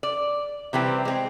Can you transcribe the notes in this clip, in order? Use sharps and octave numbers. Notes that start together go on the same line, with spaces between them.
D5
C3 E3 G3 C4
G#3 C4